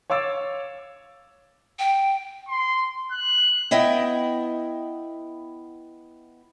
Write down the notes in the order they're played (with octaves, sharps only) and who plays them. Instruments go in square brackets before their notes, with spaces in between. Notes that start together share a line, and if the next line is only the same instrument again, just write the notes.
[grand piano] C#5 F5 D6 E6 A6
[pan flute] G5
[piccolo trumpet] C6
F#6
[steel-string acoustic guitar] B3 E4 D#5 E5 G5